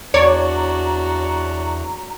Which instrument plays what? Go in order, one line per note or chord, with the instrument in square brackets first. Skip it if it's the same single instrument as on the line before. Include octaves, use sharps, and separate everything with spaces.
[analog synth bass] E2 [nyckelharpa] D4 F#4 [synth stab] C#5 D5 [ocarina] A#5